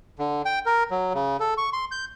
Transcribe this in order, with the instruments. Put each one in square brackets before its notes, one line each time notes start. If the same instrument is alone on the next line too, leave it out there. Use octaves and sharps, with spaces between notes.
[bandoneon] D3
G5
A#4
F#3
C#3
A4
C#6
C6
G6